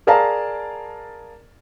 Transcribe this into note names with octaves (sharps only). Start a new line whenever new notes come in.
G#4 A#4 D5 F5 A5 A#5